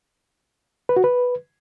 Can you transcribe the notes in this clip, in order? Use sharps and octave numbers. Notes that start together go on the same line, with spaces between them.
B4
F#4
B4